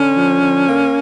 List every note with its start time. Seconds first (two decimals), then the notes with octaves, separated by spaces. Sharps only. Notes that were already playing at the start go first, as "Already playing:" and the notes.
Already playing: D3 C#4
0.16 F3
0.42 D3
0.67 A#3